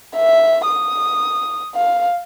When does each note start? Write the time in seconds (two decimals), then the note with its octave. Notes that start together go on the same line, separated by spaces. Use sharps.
0.17 E5
0.66 D#6
1.75 F5